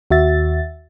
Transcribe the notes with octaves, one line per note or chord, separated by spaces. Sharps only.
D#2 F#4 E5 A6